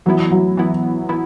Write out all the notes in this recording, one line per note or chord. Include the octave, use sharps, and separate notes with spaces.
E3 F#3 B3 E4
F#3
E3 B3 E4
E3 B3 E4